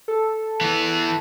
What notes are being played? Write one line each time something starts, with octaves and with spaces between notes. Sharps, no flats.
A4
E3 B3